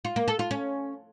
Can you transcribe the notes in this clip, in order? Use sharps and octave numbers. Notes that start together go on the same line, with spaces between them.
F4
A#3
A4
F4
C#4